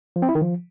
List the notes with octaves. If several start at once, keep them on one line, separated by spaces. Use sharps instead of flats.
F3
C4
E4
D#3
F3